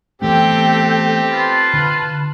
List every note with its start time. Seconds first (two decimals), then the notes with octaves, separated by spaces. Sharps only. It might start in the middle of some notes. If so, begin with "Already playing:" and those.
0.22 E3 A3 B3 C4 G4 A4 G5
1.32 F4 B4 A5
1.73 D3